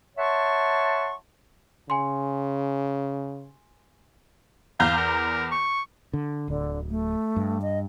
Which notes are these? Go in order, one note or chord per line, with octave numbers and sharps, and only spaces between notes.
C#5 E5 F#5 A5 C6 C#6
C#3 G#5 C6
E2 F5 A#5 G6
A#4
C#6
D3
D1 D3
A3
G2
D#5